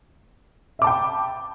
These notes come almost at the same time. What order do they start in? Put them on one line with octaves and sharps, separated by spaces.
E5 D6 A5 G5 B5